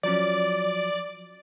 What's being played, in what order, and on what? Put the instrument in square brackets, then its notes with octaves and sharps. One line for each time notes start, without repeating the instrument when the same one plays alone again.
[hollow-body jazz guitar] F3 F#3 C#4 [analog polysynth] D5